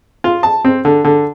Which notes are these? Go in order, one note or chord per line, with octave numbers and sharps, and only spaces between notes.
F4
A5
C4
D3
D3